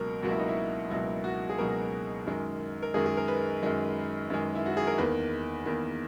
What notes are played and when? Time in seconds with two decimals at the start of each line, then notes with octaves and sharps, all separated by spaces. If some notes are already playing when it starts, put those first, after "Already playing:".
Already playing: C#2 B2 F#3 A#3 A#4
0.22 C#2 B2 F#3 A#3 F#4
0.31 E4
0.39 D#4
0.48 E4
0.90 C#2 B2 F#3 A#3 E4
1.24 F#4
1.49 G#4
1.58 C#2 B2 F#3 A#3 A#4
2.26 F#2 D#3 G#3
2.82 A#4
2.94 F#2 D#3 G#3 G#4
3.06 G#4
3.17 A#4
3.28 B4
3.63 F#2 D#3 G#3
4.30 F#2 D#3 G#3
4.55 E4
4.66 F#4
4.77 G#4
4.87 A#4
4.98 E2 D#3 A#3 B4
5.66 E2 D#3 A#3